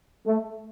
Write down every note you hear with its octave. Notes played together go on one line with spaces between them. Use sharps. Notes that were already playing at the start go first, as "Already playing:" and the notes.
A3